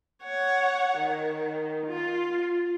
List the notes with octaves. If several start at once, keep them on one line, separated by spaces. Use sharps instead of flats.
C#5 F#5
D#3
F4